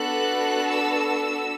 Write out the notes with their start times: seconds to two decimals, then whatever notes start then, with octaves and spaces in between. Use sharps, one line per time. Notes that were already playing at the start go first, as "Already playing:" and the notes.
Already playing: B3 D4 F#4 A4 F#6
0.68 E6